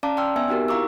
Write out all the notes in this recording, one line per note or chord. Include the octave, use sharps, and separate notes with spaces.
C#4 D5 F5 A5 A#5 D6
D5 G5 C6 E6 F6
B3 E5 G#5 E6
C4 D#4 F#4 G4 A#4
E4 F5 A#5 C#6 D6 E6